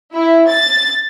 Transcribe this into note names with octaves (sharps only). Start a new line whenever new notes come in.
E4
A6